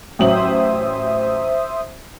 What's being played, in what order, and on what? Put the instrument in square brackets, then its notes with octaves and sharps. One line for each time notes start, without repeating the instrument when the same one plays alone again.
[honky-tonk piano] A1 F#3 F#7 [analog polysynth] C5 E5 D#6